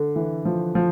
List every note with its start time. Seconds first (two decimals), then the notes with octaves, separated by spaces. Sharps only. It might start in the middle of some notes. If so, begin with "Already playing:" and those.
Already playing: D3
0.16 E3
0.45 F3
0.75 F3